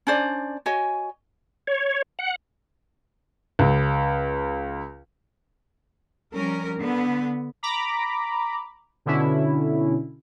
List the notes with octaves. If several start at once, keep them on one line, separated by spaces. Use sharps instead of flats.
C#4 D4 C5 D5
F#4 C#5 D#5 G#5
C#5
F#5
C#2
F3 G3 C#4 A#4
D3 B3
A#5 B5 D6
B2 D3 C#4 E4